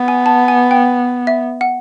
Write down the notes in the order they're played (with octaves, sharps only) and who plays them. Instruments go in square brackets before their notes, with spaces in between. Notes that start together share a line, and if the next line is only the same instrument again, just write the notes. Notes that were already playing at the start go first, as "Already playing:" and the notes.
Already playing: [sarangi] B3
[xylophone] G#5
A5
G#5
G5
E5
F#5